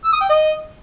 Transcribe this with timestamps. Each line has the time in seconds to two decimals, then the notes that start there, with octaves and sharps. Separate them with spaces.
0.04 E6
0.12 D#6
0.21 G5
0.29 D#5